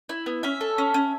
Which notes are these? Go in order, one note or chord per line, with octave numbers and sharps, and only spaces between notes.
E4
B3
C#4 E5
A4
C#4
C#4